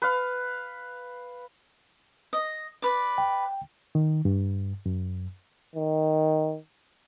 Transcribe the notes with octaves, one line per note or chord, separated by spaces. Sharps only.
B4 F5
D#5
B4 D5
G5
D#3
G2
F#2
D#3